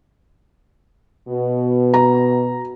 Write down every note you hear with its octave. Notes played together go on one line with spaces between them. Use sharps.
B2
A#5